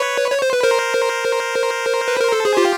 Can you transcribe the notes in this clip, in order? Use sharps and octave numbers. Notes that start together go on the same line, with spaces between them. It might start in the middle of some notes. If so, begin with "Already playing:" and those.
Already playing: B4 C#5
C#5
C5
B4
A#4 C5
B4
A#4
A4
G#4
F4 G4